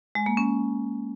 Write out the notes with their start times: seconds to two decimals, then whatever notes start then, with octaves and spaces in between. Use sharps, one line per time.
0.15 G#3
0.26 A#3
0.37 C#4